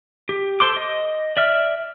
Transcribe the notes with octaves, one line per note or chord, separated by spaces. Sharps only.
G4
A4 C5 C6 D6
D#5
D5 E5 F6